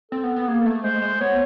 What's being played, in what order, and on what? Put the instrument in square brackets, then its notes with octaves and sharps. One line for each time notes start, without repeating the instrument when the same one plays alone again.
[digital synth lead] C4 [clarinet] A4
[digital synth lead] B3
B3
[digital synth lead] A#3 [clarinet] G#4
[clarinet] A4
[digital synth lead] A3
[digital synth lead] G#3 [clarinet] C5
[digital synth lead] G#3
[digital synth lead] B3 [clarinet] C#5